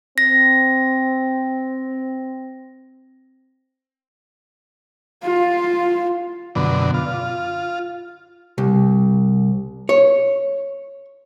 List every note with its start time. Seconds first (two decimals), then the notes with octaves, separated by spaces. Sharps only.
0.18 C4 A#6
5.23 F4
6.55 F#2 B2 D3
6.94 F4
8.58 C2
9.89 C#5